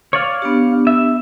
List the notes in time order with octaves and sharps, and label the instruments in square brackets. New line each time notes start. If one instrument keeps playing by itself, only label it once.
[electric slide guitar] C#5 D5 F5
[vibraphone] B3 D4 G4
[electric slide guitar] E5